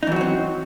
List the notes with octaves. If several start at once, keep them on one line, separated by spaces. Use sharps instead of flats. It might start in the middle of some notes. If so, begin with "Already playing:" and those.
E3 F#3 C4 D#4 F#4